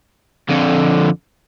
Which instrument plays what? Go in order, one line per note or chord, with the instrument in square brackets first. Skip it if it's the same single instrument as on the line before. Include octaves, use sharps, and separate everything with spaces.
[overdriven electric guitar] F2 D3